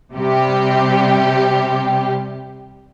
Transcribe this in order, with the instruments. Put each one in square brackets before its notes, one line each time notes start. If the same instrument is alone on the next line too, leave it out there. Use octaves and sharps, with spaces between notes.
[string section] C3 G3 G4